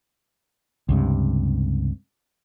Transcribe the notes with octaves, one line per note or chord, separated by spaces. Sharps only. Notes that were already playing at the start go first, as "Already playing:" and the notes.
C#2 G2 C3